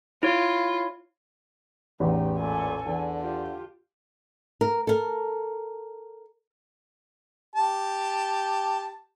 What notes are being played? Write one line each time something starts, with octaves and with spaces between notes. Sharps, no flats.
E4 F4 C#5
A1 E2 D#4 G4
A#2 A4 G#5
E2 D3
F4 G4
A#4
A4 A#4
G4 A5